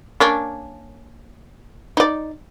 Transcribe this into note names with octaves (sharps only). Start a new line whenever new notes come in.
A#3 C#4 D4
D#4 D5